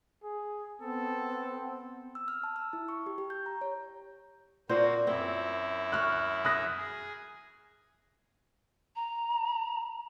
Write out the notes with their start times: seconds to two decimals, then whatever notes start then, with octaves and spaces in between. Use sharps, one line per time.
0.23 G#4
0.82 B3 C4 A4
2.15 E6
2.28 F6
2.44 A5
2.56 E6
2.73 E4
2.88 C#6
3.06 G4
3.18 G4
3.30 G6
3.46 A#5
3.61 C#5
4.69 A#2 A#3 C4 F#4 C5
5.07 F#2 C4 E4
5.92 C#6 F6 F#6
6.45 D#6 F#6 A#6
6.77 G#4
8.96 A#5